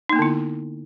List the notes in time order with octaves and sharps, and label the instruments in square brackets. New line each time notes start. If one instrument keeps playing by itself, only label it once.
[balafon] D#4
A#3
B3
D3
E4